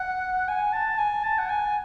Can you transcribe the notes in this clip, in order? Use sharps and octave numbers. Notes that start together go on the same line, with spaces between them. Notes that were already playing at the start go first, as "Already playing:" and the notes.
Already playing: F#5
G#5
A5
G#5
A5
F#5
G#5